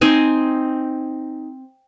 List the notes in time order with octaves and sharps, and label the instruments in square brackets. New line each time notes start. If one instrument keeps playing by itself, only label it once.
[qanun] C4 D#4 G#5